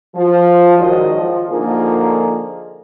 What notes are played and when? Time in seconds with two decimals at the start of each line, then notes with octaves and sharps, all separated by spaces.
0.14 F3
0.77 G#2 D#3 F#3 F#4 D5 D#5
1.13 F3
1.49 D3 F3 A#3 D#4 F4 G#4